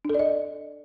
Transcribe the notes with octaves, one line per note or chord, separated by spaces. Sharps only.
D4 A4 D5 D#5